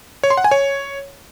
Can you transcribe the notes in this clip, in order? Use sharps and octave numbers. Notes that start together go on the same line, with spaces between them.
C#5
C6
F#5
G#5
C#5